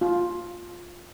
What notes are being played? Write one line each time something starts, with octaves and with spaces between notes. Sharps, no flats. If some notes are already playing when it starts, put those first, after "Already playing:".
F4